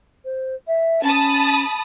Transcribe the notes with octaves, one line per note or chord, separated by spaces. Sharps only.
C5
E5
C#4 A5 B5 D#6